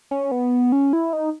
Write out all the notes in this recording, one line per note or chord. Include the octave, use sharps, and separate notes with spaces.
C#4
B3
C#4
E4
D#4